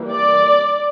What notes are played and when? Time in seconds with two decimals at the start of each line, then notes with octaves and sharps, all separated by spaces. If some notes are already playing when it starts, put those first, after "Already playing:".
Already playing: E3 G3 A#3
0.11 D5